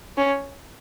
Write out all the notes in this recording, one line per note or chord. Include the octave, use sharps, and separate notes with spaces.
C#4